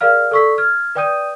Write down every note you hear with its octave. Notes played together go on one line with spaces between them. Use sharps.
G#4 A#4 D5 F5 F6
A4 D5 C#6 E6 B6
F6 G#6
B4 D5 G5 D#6 G6 D#7